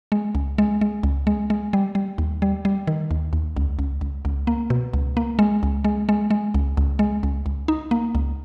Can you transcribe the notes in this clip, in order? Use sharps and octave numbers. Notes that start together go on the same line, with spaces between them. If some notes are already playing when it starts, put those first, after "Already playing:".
G#3
C#2
G#3
G#3
C#2
G#3
G#3
G3
G3
D#2
G3
G3
D#3
D#2
D#2
C#2
C#2
C#2
C#2
A#3
B2
C#2
A#3
G#3
C#2
G#3
G#3
G#3
C#2
C#2
G#3
C#2
C#2
D#4
A#3
C#2